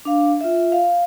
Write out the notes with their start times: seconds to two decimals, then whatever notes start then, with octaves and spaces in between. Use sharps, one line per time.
0.05 D4 F5
0.41 F4 E5
0.72 F5